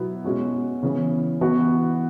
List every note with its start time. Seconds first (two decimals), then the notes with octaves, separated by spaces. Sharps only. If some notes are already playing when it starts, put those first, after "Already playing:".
Already playing: B2 F#3 B3 E4
0.25 B2 G#3 C#4 F#4
0.83 C#3 E3 B3
1.41 E3 B3 F#4